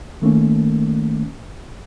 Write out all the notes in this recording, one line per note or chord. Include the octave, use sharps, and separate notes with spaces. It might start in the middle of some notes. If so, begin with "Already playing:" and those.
D#3 A3 A#3 C#4